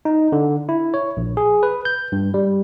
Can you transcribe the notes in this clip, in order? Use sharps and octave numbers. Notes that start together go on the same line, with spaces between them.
D#4
D3
E4
C#5
A#1
G#4
B4
G6
G2
G3